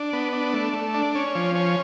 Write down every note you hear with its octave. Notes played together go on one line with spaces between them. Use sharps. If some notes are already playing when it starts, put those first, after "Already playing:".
Already playing: D4
B3
D4
A3
A3
D4
C#4
F3
C#4